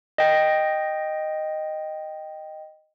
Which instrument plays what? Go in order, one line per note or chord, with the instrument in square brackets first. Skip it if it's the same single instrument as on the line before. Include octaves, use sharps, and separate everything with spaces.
[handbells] D#5 G5